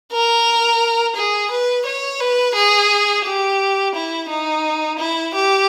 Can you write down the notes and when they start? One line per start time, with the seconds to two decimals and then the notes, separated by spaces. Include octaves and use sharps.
0.12 A#4
1.16 G#4
1.51 B4
1.86 C#5
2.20 B4
2.56 G#4
3.25 G4
3.95 E4
4.30 D#4
4.99 E4
5.35 G4